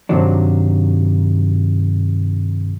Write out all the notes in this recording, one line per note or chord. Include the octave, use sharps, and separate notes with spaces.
G2 C3 D#3 F#3 D4